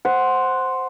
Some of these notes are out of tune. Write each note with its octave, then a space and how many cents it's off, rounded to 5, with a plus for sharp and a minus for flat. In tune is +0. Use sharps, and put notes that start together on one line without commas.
C5 +0 F#5 +0